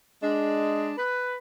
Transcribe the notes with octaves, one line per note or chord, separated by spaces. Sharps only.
G#3 D4
B4